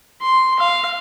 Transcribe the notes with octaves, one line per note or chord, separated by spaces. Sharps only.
C6
F5